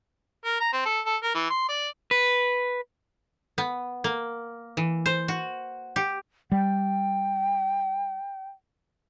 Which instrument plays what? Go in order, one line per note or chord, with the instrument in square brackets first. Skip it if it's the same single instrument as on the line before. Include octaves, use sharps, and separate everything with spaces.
[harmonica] A#4
A#5
C4
A4
A4
A#4
E3
C6
D5
[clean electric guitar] B4
[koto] B3
A#3
E3
C5
F#4
G4
[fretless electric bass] G3 [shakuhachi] G5